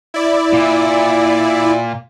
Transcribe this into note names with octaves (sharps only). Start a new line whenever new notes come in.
E4 D5
A#2